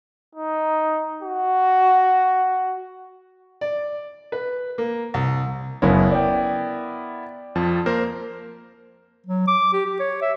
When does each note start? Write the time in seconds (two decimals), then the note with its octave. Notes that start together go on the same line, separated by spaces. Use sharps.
0.35 D#4
1.23 F#4
3.61 D5
4.32 B4
4.78 A#3
5.14 C2
5.82 F#1 B3 C#4 E4 A#4
6.11 D5 G5
7.55 F2 F3 A5
7.86 A#3 A#4 C5
9.26 F#3
9.48 D6
9.73 G4
9.86 G4
10.00 C#5
10.22 E5